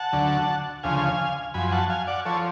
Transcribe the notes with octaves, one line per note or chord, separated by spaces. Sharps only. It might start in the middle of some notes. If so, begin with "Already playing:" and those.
Already playing: F#5 A5
D2 D3 F#3
D2 C#3 F3 F5 G#5
F#2 F3 G#5 B5
G#5
F#5 A5
F5 G#5
D5 F#5
F3 A4 C#5